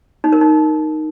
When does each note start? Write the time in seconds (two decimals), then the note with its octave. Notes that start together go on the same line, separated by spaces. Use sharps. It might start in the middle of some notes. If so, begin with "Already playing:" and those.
0.24 D#4
0.33 A#4
0.41 D#4